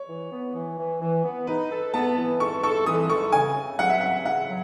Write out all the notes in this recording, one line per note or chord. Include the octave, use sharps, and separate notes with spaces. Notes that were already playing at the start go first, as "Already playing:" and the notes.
Already playing: C#5
E3
B3
E3
E3
E3
B3
D#4 B4
A4
B3 A5
E3
A4 C#6
A4 C#6
E3 D#6
A4 C#6
C#3 G#5
C#3
F#3 F#5
E5
C#3 F#5
C#3 F#5
F#3